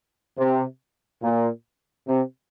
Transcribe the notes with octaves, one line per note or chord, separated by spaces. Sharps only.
C3
A#2
C3